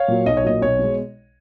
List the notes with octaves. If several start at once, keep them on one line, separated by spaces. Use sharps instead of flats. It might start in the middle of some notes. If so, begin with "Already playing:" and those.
Already playing: C#5 F5
A#2 F#3
B1 D#5
C#5
A#2 F#3 D#5
B1 C#5
B2 G#3